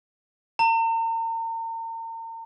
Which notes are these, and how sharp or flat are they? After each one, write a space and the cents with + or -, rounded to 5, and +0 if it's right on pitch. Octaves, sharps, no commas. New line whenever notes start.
A#5 -40